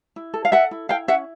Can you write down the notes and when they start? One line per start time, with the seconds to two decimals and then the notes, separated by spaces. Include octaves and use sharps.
0.16 E4
0.34 A4
0.45 F5
0.52 A4 E5 F#5
0.71 E4
0.89 E4 F5 G5
1.08 C#4 E5 F#5